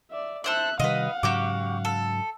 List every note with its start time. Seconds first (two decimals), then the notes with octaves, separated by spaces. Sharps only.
0.11 D5 E5
0.44 A4 C5 D5 E5 F#6
0.79 C3 D#3 G3 B4 D#5 F5 F#5
1.23 G#2 C#3 F#3 F#4 G4 D6
1.85 A4